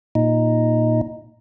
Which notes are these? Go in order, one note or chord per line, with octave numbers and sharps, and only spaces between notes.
A#2 D#4